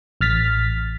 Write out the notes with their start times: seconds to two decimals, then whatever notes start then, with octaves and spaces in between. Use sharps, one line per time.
0.21 A1 F6 A6 B6